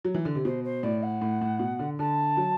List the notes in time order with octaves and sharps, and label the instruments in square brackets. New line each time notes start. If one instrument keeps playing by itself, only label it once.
[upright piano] F#3
E3
D3
C3
[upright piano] B2 [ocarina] C5
[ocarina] C5
[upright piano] A2 [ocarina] D5
[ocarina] F#5
[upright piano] A2
A2
B2
D3
[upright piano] D3 [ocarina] A5
[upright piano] F#3